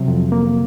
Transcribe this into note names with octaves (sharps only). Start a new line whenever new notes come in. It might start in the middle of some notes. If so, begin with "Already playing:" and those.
Already playing: C3 F#3
F2
A#3